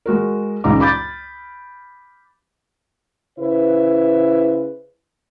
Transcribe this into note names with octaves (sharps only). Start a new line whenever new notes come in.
G#3 F#4 A#4
C#2 C#3 G#3 D#4 A#5 D6
B5 D6 G6 A6
C#3 E4 B4 C5